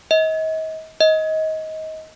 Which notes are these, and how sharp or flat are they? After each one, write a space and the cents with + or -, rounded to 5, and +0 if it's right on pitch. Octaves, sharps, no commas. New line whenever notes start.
D#5 +35
D#5 +20